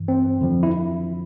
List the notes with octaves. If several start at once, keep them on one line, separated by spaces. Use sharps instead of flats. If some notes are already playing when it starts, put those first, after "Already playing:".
Already playing: G2 E3
C4
F2 D3 F3
E4